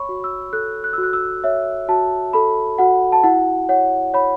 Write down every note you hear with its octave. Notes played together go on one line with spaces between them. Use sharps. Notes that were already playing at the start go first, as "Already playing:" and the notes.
Already playing: C#5 B5 C#6
F#4
E6
A4 F#6
F#6
F#4 E6
F#6
E6
C#5 E5
F#4 A5
A4 B5
F#4 F#5
A5
E4 F#5
C#5 F#5
C#5 B5